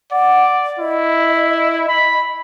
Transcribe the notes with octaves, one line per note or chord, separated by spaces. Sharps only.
D5 F#5
E4 D#5
B5